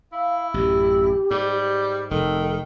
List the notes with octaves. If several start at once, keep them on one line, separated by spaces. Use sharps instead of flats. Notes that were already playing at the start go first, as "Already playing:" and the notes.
E4 F5
A1 F#2 G4
G#2 G3
F1 D#3 A4